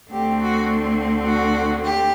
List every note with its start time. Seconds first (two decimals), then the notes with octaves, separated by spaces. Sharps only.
0.12 D2 D3 A3 C4 G4
0.41 F#4
1.27 F#4
1.84 G4